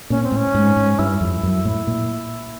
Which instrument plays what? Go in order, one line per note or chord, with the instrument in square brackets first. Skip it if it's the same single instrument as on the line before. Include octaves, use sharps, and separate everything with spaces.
[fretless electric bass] A#2 [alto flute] C#4
[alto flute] C4
[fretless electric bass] A2 [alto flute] C#4
[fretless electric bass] G#2
G#2
[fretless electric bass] G2 [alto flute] E4
[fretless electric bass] F2
F#2
A2
A#2